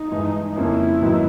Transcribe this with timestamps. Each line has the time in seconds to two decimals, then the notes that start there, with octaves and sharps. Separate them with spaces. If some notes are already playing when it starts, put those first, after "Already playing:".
Already playing: D#4
0.12 G2 E3 G#3
0.56 F2 C#3 F3 A#3 C#4 E4
1.01 G#2 D#3 F#3 B3 D#4